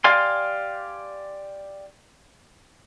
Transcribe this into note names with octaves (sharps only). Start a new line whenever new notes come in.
G4 D5 F5 G#5 C6